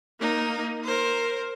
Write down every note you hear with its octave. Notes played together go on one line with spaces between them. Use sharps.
A#3 D#4
A#4 C5